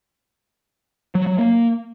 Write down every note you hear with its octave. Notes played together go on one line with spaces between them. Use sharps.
F#3
F#3
A#3